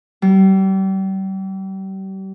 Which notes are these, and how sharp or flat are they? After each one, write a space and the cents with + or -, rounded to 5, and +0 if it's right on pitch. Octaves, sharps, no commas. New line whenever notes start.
G3 -35